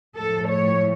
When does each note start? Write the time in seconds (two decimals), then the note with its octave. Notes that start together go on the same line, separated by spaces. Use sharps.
0.16 A2 F3 A3 A4
0.48 C#5